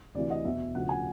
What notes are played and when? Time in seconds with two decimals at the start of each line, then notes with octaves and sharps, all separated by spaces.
0.15 D2 C3 E3 D5
0.30 D#5
0.45 E2 B2 E5
0.75 D2 C#3 F3 F#5
0.89 G#5